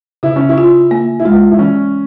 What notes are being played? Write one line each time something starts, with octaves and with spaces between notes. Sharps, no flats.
C#3 E4
C#4
E4
F4
A#3
E4
G#3 F4
E4
E3 C#4